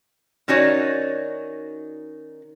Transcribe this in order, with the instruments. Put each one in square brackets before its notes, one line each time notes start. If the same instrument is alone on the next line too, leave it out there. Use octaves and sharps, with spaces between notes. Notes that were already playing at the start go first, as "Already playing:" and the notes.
[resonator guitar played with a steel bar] D#3 C#4 D#4 F#4 C#5 D5